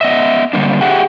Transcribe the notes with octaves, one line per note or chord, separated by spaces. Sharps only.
B3 D#5 E5
D3 G3 A#3 D4
G4 G#4 E5 F#5 G5